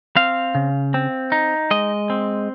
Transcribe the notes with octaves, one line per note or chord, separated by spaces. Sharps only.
C4 F5
C#3
C4
D#4
G#3 D#5
C4